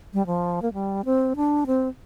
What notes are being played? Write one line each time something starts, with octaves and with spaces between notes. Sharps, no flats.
G3
F3
A#3
G3
C4
D4
C4